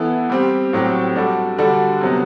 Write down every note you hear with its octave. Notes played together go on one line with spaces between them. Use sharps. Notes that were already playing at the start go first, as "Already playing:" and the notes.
Already playing: E3 B3 E4 A4
G3 C4 G4
A2 F#3 C4 G4
G3 D4 F#4 A4
D3 G3 D4 F#4 A4
C3 F#3 B3